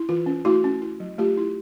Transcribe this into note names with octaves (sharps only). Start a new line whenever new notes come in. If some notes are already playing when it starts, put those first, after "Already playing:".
Already playing: E4
E3 F4
C#4
A3 E4 F#4
C#4
E4
F#3
A3 F4 G4
E4